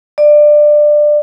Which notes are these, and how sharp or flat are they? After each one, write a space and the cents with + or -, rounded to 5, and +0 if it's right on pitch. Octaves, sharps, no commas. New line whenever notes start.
D5 +20